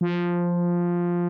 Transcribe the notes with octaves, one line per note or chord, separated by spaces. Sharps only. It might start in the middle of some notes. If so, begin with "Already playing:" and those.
F3